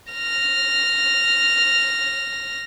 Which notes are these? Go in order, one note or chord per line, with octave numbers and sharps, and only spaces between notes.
F6 A#6